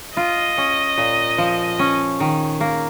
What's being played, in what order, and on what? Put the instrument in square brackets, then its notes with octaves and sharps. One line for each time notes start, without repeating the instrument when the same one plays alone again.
[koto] F4 [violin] D#5
[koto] C#4
A#2
F3
C#4
D#3
A#3